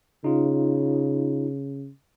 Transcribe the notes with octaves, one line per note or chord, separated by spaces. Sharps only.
C#3 D#4 F4